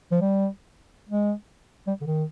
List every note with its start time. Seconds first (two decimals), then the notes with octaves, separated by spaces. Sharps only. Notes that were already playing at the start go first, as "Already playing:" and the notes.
0.11 F3
0.21 G3
1.09 G#3
1.87 G3
2.01 D3
2.06 D#3